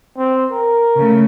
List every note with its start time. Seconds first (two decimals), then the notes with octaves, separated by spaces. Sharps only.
0.17 C4
0.51 A#4
0.96 C#3 A3